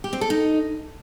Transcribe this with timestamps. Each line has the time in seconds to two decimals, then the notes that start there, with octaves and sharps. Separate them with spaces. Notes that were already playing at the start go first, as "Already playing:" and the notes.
0.04 G4
0.13 C4
0.21 A4
0.30 D#4